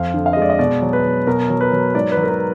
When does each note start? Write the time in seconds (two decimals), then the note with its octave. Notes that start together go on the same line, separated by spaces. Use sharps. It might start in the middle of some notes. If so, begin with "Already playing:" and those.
Already playing: F2 F5
0.14 D3
0.26 F5
0.33 D#5
0.37 G#3
0.42 D5
0.50 D#5
0.59 B2 D5
0.82 F#3
0.93 B4
1.04 F#3
1.27 B2 A#4
1.50 F#3
1.61 B4
1.72 F#3
1.95 G#2 D5
2.12 B4
2.17 F#3
2.23 A#4
2.29 B4